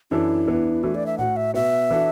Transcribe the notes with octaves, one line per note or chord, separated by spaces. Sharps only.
F#2 E3 D4 E4 A4
E2 E3 B3 D4
E3 A3 D4 F#4 A4
D5
E5
A2 A3 F#4 F#5
E5
B2 B3 F#4 E5
E3 D4 F#4 A4